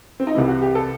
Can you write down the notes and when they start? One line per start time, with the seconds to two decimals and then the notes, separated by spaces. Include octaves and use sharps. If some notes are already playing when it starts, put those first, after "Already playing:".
0.20 C4
0.27 D#4
0.35 C2 C3 E3 E4
0.48 F#4
0.61 G4
0.75 A4